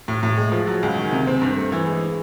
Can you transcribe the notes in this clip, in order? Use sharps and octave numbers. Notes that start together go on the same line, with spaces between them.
A2
A2
G#3
F3
F#3
C#2
D#3
C3
C4
G2
A3
E3
G#3